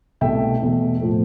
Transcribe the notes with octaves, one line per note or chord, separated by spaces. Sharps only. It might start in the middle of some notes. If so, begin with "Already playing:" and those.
C2 B2 A3 E5 G5
E2 B2 A3
A2 F3 A3